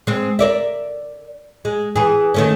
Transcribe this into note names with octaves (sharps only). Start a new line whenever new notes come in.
G#3 C4
A#4 D5 E5
G#3
E3 G#4
D#3 A3 C#4